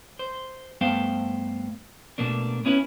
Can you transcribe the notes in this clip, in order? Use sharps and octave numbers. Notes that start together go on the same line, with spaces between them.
C5
G2 A3 B3 C5 F5 G5
B2 A3 A#3 D4
B3 C#4 E4 B4